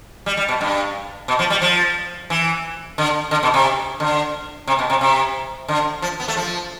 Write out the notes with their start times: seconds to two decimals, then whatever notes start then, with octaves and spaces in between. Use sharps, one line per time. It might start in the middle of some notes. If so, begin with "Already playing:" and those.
0.26 G3
0.37 G3
0.49 B2
0.61 G2
1.28 B2
1.39 F3
1.50 G3
1.62 F3
2.30 E3
2.98 D3
3.31 D3
3.43 B2
3.54 C3
4.00 D3
4.67 C3
4.79 B2
4.90 C3
5.01 C3
5.68 D3
6.02 F3
6.20 B3
6.28 A3
6.37 F3